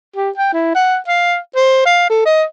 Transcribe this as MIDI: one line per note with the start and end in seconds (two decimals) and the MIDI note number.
0.16 0.30 67
0.38 0.51 79
0.54 0.72 64
0.75 0.97 78
1.08 1.38 77
1.56 1.83 72
1.86 2.07 77
2.10 2.23 69
2.26 2.43 75